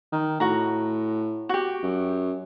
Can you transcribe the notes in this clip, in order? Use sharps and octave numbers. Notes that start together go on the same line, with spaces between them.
D#3
A2 F#4 A#5
F#4 G4
F#2